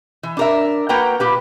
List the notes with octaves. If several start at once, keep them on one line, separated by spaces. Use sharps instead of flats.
E3
D4 A#4 E5
A#3 F#4 B4 F#5 G5 A#5
A#2 G4 B4